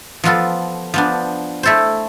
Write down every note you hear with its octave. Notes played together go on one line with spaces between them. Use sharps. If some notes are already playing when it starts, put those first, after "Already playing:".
F3 B3 F4 A4
F3 B3 D4
A3 E4 A4 C5